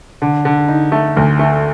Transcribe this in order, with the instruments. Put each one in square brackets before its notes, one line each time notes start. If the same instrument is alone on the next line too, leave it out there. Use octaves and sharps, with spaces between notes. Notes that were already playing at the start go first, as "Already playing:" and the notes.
[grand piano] D3
D3
D#4
A3
D2
A3